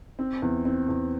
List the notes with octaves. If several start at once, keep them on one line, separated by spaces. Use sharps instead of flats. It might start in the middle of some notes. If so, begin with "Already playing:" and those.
C4
E2
C4
E2